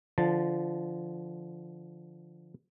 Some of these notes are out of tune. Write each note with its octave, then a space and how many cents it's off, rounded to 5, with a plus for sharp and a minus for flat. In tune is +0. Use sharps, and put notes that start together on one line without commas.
D3 +0 F3 -20 A5 +0